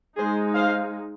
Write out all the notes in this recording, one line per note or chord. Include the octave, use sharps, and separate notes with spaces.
G#3 D#4 G#4 C5
C5 F5